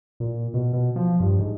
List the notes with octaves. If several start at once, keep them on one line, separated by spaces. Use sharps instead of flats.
A#2
B2
B2
F3
G2
G#2